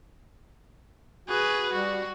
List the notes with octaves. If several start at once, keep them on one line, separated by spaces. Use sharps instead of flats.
F#4 G#4 B4
G3 F#4